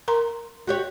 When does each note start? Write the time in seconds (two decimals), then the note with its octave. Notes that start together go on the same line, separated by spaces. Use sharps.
0.08 A#4 A#5 C6
0.67 F#4 G4 C#5